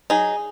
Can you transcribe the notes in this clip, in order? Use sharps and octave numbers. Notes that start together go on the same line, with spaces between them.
F#3 D#4 G#4